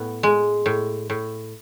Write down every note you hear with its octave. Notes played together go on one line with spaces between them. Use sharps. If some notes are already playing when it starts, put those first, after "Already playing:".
Already playing: A2 B3
G#3
A2
A2